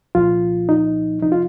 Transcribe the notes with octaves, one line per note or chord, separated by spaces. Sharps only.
C2 A#2 F3 F4
D#4
C3 F3 D#4
F4